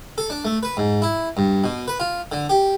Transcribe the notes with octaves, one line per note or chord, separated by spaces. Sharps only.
A4
D4
A3
B4
G#2
E4
G2
B2
B4
F4
D3
G4